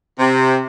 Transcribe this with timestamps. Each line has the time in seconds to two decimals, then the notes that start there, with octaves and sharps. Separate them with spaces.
0.19 C3